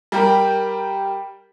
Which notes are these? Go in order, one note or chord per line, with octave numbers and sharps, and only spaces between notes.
G3 G4 A#4